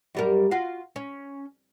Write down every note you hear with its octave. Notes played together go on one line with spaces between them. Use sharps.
F#2 G3 A#4
F4 F#4 F5
C#4